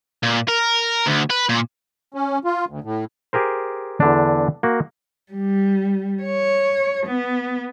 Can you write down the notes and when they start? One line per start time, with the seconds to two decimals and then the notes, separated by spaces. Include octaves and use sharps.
0.23 A#2
0.48 A#4
1.07 D2
1.30 B4
1.49 A#2
2.14 C#4
2.44 F4
2.69 D2
2.84 A2
3.33 G4 G#4 A#4 C5
4.00 E2 D3 D4
4.63 A#3 F#4
5.33 G3
6.23 C#5
7.07 B3